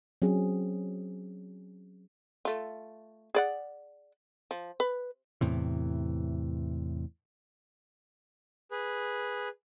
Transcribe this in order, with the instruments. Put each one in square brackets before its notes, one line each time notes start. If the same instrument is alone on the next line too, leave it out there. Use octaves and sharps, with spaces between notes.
[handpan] F#3 C4 C#4 G#4
[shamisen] A3 F4
G#4 D5 F#5
F3
B4
[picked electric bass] E2 A2 C3 E3
[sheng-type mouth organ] G#4 B4